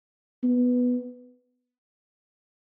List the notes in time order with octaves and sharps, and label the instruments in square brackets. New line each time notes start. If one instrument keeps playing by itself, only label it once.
[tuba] B3